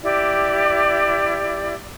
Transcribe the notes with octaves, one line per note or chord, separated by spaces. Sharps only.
E4 G4 D5